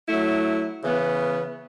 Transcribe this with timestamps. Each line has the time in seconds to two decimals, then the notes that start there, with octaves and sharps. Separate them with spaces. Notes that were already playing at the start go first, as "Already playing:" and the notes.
0.07 F#3 A3 E4
0.82 C#3 E3 B3